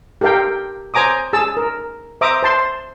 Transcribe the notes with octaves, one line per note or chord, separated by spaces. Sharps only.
G4 A4 A#4 F5 G5
C5 G#5 A#5 D6 D#6
G#4 A5 E6
A#4
C5 E5 A#5 D6 D#6
C5 A5 C6